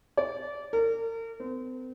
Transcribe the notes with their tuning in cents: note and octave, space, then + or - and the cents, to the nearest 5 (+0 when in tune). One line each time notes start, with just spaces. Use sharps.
D5 -25
A#4 -40
C4 -35